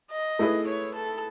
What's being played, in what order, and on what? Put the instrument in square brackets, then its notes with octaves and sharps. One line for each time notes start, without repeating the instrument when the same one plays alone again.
[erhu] D#5
[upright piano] A3 E4 G#4 B4
[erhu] C#5
A4